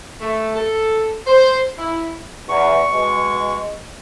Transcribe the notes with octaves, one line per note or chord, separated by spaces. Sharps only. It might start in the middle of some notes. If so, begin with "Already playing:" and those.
A3
A4
C5
E4
E2 C#6
B2 G#3